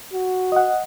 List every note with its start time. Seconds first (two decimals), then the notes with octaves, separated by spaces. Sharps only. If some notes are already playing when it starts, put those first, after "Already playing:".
0.13 F#4
0.52 D#5 F#5